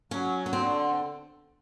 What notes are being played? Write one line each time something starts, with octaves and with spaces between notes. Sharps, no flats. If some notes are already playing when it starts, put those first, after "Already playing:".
F#3 C#4
C#4
D3 C4